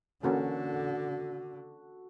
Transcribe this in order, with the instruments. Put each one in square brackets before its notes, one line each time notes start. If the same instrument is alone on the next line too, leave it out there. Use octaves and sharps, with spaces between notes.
[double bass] D3 [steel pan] E3 A#3 C#4 [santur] F#4 A4